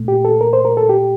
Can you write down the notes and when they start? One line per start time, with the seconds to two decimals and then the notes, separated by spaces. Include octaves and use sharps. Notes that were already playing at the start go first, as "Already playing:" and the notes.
Already playing: A#2 A3
0.08 G4
0.25 A4
0.41 A#4
0.53 C5
0.65 A#4
0.77 A4
0.89 G4